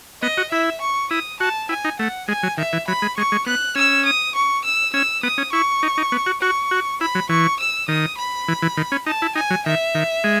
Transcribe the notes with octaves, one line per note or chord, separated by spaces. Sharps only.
B3 D#5
F#4
E4 E5
C#6
E4 D#6
F#4 A5
E4 G#5
D#4
A3 F#5
G#3 G#5
F#3
D#3 E5
E3
F#3 B5
G#3
G#3 C#6
G#3
B3 F#6
C#4 E6
D#6
C#6
E6
C#4 E6
B3 D#6
C#4
E4 C#6
D#4
D#4
B3
F#4
F#4 C#6
F#4
E4 B5
F#3
E3 C#6
E6
D#3 D#6
B5
E3
E3
D#3
C#4
D#4 A5
E4
D#4 G#5
F#3
D#3 E5
D#3
G#3